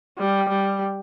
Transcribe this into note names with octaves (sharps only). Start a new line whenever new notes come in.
G3
G3